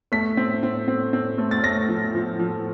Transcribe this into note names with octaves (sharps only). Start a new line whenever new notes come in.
A3 B6
C4
C4
C4
C4
A3
A6
A3 A#6
F3
F3
F3